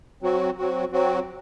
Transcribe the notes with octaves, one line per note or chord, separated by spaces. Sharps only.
F#3 C4 F#4
F#3 C4 F#4
F#3 C4 F#4